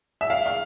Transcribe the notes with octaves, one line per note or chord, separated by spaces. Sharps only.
E5
F5
F5